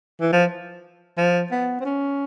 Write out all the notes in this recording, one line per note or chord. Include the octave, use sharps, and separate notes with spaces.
E3
F3
F3
B3
C4
C#4